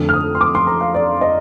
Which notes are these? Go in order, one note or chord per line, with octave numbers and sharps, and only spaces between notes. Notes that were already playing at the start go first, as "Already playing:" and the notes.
Already playing: F2 D3 A3
F6
D#6
C6
D6
C6
A#5
F5
D5
D#5